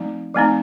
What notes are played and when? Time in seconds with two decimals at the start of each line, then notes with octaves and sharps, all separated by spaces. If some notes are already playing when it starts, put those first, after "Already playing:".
Already playing: F3 A3 C4 D#4
0.34 F3 A3 C4 D#4